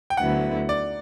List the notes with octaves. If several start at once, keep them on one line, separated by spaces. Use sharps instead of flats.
G5
D2 D3 F#3 B3 E4 F#5
D5